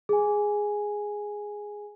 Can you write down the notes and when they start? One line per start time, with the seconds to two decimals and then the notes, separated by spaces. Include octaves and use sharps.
0.09 G#4 G#5